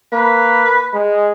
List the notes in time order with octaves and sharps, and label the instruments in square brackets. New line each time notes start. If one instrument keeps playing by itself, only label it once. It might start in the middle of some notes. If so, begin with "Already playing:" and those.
[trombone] A#3 [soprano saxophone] B4
[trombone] G#3